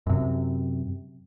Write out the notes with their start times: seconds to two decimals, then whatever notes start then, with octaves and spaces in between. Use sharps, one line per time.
0.07 F#2 C3